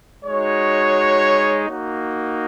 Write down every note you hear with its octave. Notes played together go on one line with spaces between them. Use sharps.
G#3 D#4 F#4 C#5
A#3 D#4 F#4